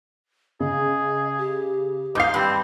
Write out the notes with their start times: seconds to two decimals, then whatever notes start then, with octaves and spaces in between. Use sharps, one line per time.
0.60 C#3 G#4 D#5
1.38 G4
2.15 G#2 D#5 F5 D6 G6 C7
2.34 G2 G3 C4